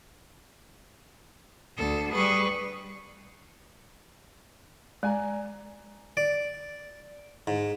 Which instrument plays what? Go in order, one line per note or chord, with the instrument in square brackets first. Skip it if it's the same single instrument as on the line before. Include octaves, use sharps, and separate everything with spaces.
[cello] D2 A4
[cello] G3 G#4 [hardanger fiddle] B4 C#6
[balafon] G#3 [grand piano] D5 G#5 A#5
[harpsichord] D5
G#2